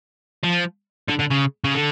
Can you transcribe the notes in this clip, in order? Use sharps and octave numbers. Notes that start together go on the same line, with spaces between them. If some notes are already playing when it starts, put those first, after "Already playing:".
F3
D3
D3
C#3
C#3
D3